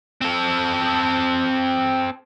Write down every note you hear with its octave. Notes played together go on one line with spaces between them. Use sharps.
C4 A4